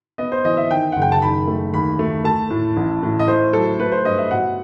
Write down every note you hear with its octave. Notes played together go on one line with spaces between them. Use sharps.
B3 D#5
C5
E3 D#5
E5
D#3 G5
F#1 F#5
G5
A5
D#3 B5
A3
D#2 B5
A3
A3 A5
A2
A1
A2
D#5
A3 C5
F#3 A4
A3 B4
C5
G2 D#5
E5
B2 F#5